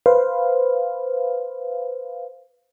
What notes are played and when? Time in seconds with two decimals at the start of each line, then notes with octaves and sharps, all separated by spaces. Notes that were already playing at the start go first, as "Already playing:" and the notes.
0.06 B4 C5 F5